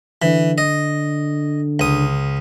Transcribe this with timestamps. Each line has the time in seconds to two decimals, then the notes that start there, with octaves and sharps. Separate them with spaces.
0.22 D3 E3
0.58 D#5
1.80 C#2 D#6